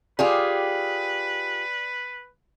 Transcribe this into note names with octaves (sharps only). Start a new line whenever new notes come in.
F4 G4 G#4 B4 D5